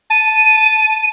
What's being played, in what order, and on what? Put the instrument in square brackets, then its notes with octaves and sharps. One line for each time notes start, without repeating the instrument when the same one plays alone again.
[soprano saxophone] A5 [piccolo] D#7